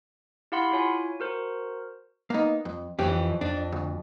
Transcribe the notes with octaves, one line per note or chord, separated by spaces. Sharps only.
E4 G4 F5 F#5 B5 C6
E4 F4 C#5 G#5
F#4 A#4 C5
A#3 B3 D#4
F2
F2 D#3 E3 C#4 G4
F2 D4
D2